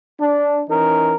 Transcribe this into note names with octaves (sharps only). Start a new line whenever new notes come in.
D4
E3 C#4 D#4 A#4